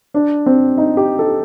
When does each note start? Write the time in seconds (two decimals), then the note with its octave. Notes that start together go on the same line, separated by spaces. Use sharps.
0.14 D4
0.46 C4
0.77 D#4
0.97 G4
1.19 A4